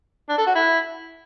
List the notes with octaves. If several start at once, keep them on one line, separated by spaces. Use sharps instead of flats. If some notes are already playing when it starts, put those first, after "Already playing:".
D4
A4
F#4
E4